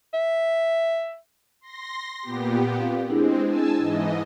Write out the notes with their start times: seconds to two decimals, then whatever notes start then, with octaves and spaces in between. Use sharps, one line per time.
0.14 E5
1.61 C6 A#6
2.23 A#2 B3 G4
2.80 C4 F4 F5
3.10 G#3 C4 D4 E4 G#4
3.46 G#5 A5 E6
3.77 G#2 E3 D#5